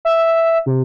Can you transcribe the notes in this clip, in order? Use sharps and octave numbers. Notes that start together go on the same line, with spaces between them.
E5
C3